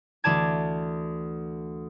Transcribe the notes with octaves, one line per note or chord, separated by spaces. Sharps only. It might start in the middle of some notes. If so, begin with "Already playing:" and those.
D2 E3 D5 A5 G#6